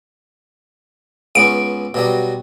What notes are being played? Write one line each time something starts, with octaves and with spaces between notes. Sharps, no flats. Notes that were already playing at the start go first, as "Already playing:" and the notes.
C#2 B3 C#4 D7
B2 F#3 G3